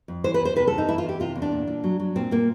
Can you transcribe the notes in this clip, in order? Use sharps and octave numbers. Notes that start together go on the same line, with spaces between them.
F2
E3 C5
B4
E2
C5
C3 B4
E2 A4
D#4
E3 E4
F4
E2
G4
C3 F4
E2
D4
A#2
A#2
F#3
F#3
A#2 C4
A#2 A#3